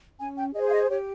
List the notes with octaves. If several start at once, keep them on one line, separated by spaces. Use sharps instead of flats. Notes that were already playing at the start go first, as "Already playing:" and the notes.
C#4 G#5
G5
G#4 C5 D#5
F5
D#5
G4 C#5